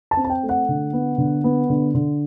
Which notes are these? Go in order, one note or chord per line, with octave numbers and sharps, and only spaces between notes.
A5
C4
A5
G5
A3
F#5
D3
B3
D3
B3
D3
D3